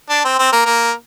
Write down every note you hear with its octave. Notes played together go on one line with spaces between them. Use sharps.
D4
C4
C4
A#3
A#3